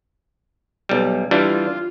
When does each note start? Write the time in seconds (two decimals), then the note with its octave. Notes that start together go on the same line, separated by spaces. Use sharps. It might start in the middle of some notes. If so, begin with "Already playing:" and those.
0.89 B1 G3
1.31 E3 G3 D4 F4